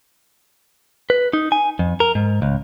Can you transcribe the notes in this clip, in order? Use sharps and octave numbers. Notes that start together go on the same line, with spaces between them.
B4
D#4
G#5
F2
A#4
G#2
C#2